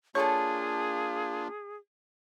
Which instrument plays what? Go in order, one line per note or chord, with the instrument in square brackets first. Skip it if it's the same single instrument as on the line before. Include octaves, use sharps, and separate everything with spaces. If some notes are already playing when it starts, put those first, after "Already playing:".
[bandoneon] A#3 D4 F4 [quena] G#4 [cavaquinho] A4 C#6 [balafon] C#5 A5